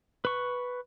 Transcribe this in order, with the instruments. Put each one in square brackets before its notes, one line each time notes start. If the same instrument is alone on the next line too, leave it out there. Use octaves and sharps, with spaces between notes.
[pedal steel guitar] B4 C#6